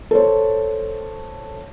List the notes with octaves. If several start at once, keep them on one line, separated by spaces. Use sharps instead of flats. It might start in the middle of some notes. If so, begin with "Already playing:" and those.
A4 C5 C#5